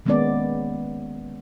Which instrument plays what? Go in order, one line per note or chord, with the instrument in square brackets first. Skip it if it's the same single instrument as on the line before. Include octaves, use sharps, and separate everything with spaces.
[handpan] D#3 G#3 A#3 B3 C#4 D5